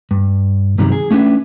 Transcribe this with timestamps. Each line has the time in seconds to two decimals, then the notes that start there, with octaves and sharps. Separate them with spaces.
0.11 G2
0.78 G2 C3 D#3 F#3 G3
0.92 G#4
1.11 A3 C#4 D4 B4 E5